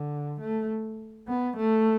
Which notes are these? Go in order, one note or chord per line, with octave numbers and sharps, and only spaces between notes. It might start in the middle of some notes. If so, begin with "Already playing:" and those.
Already playing: D3
A3
B3
A3